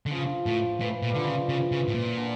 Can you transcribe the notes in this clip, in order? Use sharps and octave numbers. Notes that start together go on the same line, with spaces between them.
D3
C#3 F3
A2 F3
A2 E3
A#2
D3 F3 G3
C#3
C#3 E3
C#3
A2
A#2
D3